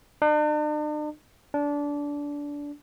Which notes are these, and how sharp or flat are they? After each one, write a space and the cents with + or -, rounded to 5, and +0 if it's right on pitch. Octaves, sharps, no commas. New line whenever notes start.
D4 +45
D4 -20